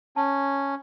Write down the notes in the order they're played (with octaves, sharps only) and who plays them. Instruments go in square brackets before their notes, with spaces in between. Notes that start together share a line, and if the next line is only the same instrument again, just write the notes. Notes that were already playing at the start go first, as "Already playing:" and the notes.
[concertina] C#4 [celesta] A5